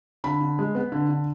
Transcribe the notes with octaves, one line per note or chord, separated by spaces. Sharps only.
D3 B5
D3
G#3
B3
D3
D3